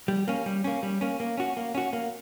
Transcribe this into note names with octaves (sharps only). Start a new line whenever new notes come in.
G3
A#3 C#4
G3
A#3 C#4
G3
A#3 C#4
A#3
C#4 F#4
A#3
C#4 F#4
A#3